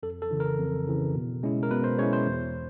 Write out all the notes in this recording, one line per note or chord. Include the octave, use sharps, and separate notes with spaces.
F2 A4
A4
C#3 E3
A#4
F2
C#3 E3
B2
G#3 C#4 E4
A#4
B2 B4
C5
G#3 C#4 E4 C#5
C5
E2